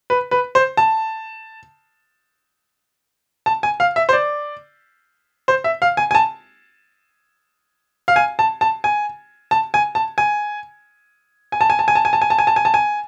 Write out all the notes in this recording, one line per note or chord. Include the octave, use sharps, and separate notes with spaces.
B4
B4
C5
A5
A5
G#5
F5
E5
C5
D5
C5
E5
F5
G#5
G#5
A5
F5
G#5
A5
A5
G#5
A5
G#5
A5
G#5
G#5
A5
G#5
A5
G#5
A5
G#5
A5
G#5
A5
G#5
A5
G#5
A5
G#5